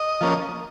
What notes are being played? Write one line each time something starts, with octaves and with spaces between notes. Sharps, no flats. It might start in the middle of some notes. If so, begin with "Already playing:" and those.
Already playing: D#5
F3 A#3 C#4